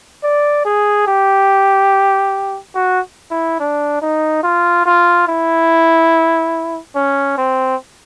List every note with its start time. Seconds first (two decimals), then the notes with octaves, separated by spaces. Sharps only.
0.24 D5
0.66 G#4
1.07 G4
2.75 F#4
3.31 E4
3.60 D4
4.02 D#4
4.44 F4
4.86 F4
5.28 E4
6.96 C#4
7.38 C4